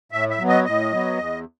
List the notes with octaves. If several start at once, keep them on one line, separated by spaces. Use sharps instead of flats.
A2 E5
E5
F#3 B3
D#5
A2 D#5
F#3 B3
E2